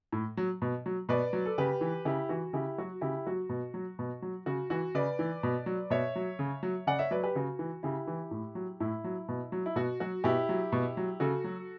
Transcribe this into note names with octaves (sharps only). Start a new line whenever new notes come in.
A2
F#3
B2
F#3
B2 B4 D5
F#3
A4
C#3 G4 B4
E3
C#3 E4 G4
E3 F#4
C#3 E4 G4
F#3 F#4
C#3 E4 G4
F#3 F#4
B2
F#3
B2
F#3
C#3 F#4
E3 F#4
C#3 B4 D5
E3
B2
F#3
B2 C#5 E5
F#3
C#3
F#3
C#3 D5 F#5
C#5 E5
F#3 B4 D5
G4 B4
C#3 F#4
E3
C#3 E4 G4
E3
A2
F#3
A2 E4
F#3
B2
F#3
E4
B2 F#4
F#3 F#4
B2 E4 G4
F#3
B2
F#3
C#3 F#4 A4
F#3